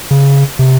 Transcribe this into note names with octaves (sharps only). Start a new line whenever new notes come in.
C#3
C3